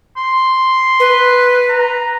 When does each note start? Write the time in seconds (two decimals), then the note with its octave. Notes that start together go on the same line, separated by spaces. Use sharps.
0.17 C6
1.00 B4
1.69 A#5